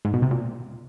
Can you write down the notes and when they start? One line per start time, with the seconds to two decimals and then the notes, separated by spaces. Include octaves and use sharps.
0.05 G#2
0.14 B2
0.22 C3
0.31 A#2